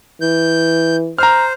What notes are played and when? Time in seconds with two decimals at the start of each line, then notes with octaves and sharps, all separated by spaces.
0.21 E3 G6
1.18 C5 A#5 F6